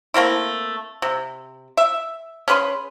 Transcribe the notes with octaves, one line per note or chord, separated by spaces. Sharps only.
A3 A#3 C4 E4
C3
E5
C#4 G#4 B4 C6